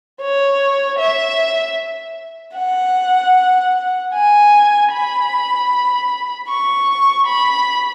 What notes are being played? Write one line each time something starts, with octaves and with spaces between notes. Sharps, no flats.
C#5
E5
F#5
G#5
B5
C#6
B5